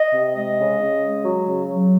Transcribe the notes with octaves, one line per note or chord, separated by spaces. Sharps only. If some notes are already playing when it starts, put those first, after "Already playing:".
Already playing: D#5
C3
G#3 D#5
C#3
C#3
G#3
F#3
C#3
F#3